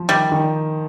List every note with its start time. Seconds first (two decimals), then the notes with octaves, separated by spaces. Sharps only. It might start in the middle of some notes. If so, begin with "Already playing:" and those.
Already playing: F3
0.09 D#3 G3
0.32 D#3